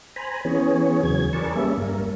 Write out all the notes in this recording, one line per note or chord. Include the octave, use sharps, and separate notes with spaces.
C5 G#5 A#5 B5
E3 B3 C#4 G#4 C#5
E2 C#3 F#3 G#6
G#4 A#4 B4 D5 A5 C#6
G3 A#3 C#4 E5
G2 A#4